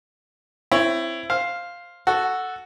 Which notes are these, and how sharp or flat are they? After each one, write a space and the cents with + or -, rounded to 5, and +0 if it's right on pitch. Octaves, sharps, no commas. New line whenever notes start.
C4 +0 E4 +15 C#5 +5
C5 +5 F5 +0
F#4 +0 A4 +0